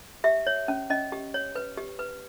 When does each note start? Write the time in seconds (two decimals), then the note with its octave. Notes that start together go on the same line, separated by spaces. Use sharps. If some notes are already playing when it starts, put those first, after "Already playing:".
0.24 G4 E5
0.47 C#5
0.68 C#4
0.90 C#4 D#5
1.12 G4
1.34 C#5
1.55 B4
1.77 G4
1.99 B4